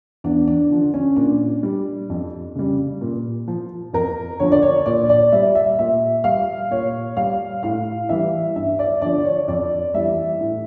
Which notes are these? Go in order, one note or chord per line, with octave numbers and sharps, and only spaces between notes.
E2 D4
D4
D3 F3
C#4
A#2 D4
G3
F2
C#3 G3
A#2
F3
F2 A#4
D3 F3 C#5
D5
C#5
A#2 D5
D5
G3 E5
E5
A#2 E5
G3 F5
A#2 C#5
G3 F5
A2 F5
E3 G3 E5
G2 E5
D5
D3 F3 D5
C#5
F2 D5
E3 G3 E5
A2